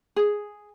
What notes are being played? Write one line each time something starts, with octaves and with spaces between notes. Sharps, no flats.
G#4